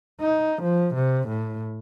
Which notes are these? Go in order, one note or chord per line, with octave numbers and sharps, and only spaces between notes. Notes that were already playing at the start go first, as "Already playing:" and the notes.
D#4
F3
C3
A2